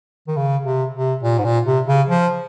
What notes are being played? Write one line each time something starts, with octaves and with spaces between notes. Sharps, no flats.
D#3
C#3
C3
C3
A#2
G#2
A#2
C3
C#3
F3